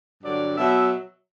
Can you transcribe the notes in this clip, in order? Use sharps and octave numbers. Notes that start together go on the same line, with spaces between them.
G2 D3 F#3 D5
B2 F#3 E5